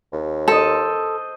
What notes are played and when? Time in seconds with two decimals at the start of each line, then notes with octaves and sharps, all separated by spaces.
0.13 D#2
0.48 A4 C5 D#5